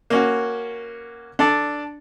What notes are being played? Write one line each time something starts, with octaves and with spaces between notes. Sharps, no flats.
A#3 C#4 F#4
D4 A4 D5